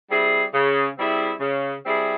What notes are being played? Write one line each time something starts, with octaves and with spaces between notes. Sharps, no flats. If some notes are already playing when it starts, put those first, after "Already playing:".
G3 C4 E4 G#4
C#3
G3 C4 E4 G#4
C#3
G3 C4 E4 G#4